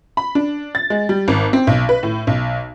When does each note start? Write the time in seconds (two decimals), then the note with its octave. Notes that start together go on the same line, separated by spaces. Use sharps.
0.17 B5
0.35 D4
0.75 A6
0.90 G#3
1.09 G3
1.28 G#1
1.53 C4
1.67 B1
1.89 B4
2.03 A2
2.27 B1